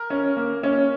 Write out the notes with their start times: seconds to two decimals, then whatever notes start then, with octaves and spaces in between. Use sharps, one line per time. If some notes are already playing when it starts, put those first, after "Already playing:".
Already playing: A#4
0.10 C#4
0.37 A#3
0.63 C#4